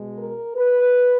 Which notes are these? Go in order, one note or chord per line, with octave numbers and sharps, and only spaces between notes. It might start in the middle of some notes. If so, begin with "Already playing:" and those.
Already playing: B2 G#3
A#4
B4